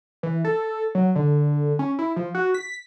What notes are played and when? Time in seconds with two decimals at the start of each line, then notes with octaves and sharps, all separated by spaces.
0.23 E3
0.45 A4
0.95 F#3
1.16 D3
1.79 C#4
1.99 E4
2.16 F3
2.35 F#4
2.54 B6